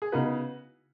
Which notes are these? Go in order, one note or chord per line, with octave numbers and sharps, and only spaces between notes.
G#4
C#3 B3 D#4 F#4 B4